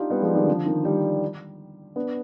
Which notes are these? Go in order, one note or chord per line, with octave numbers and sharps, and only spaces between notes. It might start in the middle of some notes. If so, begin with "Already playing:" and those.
Already playing: D4 D#4 F4 G4
G3 B3
F3 G#3
D#3 G3
D3 F3
D#3
D#3 G3
B3 D4